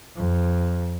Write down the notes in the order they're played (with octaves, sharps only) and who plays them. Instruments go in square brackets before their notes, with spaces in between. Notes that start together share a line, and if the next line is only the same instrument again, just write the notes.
[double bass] F2